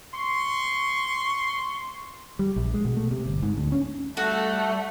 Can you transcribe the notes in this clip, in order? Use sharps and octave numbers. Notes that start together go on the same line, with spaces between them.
C6 C#6
G3
A#1
G#3
B2
A3
C3
G1
G#2
D2
C#4
G3 A3 F#4 A4